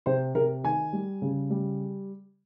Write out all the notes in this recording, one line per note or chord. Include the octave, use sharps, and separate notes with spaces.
C3 C5
C3 A#4
D#3 G#5
G3
C#3
G3